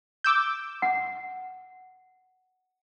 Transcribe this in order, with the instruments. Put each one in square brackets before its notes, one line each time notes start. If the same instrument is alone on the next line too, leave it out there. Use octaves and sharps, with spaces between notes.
[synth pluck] D6 E6 G6
[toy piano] F#5